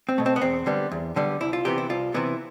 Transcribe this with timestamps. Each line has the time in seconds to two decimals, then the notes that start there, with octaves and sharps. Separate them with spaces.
0.09 C4
0.18 B2 A3
0.26 C4
0.36 B3
0.41 E2 C4
0.66 D3 G3 B3
0.92 E2
1.16 D3 G3 B3
1.40 C2 E4
1.53 F4
1.65 C3 E3 B3 G4
1.78 E4
1.89 C2 F4
2.14 C3 E3 B3 E4